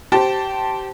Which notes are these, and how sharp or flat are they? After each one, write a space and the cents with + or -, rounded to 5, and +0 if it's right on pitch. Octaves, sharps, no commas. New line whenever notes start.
G4 -25 C5 +0 A5 +0